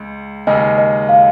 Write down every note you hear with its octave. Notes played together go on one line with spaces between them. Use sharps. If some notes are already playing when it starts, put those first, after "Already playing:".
Already playing: C#2 G#3
D#2 C#3 G#3 D#4 D#5
D#5
F5